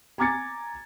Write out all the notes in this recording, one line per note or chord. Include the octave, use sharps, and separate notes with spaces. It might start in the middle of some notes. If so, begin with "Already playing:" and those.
G#5 A#5 D6 G#6 A6 C#7